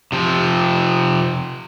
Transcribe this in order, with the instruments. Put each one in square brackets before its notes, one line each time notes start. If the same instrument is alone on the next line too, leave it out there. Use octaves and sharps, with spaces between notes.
[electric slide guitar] C3 F3